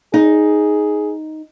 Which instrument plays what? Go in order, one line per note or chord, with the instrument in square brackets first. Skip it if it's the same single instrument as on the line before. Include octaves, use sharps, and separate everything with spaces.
[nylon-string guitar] D#4 [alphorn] G#4